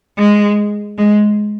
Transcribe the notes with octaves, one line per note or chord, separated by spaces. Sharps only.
G#3
G#3